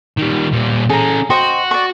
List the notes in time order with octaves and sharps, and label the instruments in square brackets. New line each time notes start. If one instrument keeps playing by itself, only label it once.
[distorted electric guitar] D#3 G3
A#2 G3
[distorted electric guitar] C#4 A4 [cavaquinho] G#4 A#5
[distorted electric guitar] F#4 [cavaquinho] C5 D#5 G5
[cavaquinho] D5 C#6